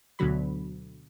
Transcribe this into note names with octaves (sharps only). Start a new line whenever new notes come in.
D2 B2 D3 F#3 B5